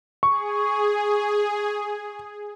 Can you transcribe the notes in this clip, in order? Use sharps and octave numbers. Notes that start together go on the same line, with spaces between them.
G#4 C#6